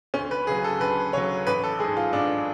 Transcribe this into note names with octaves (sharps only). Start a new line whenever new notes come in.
D2 C#4
B4
C#3 F#3 G#4
A4
D2 B4
C#3 F#3 C#5
A1 B4
A4
G#3 G#4
G#2
F4
A1 D4